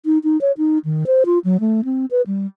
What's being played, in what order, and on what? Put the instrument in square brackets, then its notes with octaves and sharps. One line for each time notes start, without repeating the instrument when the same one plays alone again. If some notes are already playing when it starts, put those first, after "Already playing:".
[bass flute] D#4
D#4
C#5
D#4
D#3
C5
F4
F#3
A3
C4
B4
G3